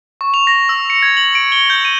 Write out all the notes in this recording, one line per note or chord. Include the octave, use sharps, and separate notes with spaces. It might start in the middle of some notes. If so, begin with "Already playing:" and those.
C#6
F7
A#6
E6
C#7
G#6
F#7
D7
G7
G6
D#7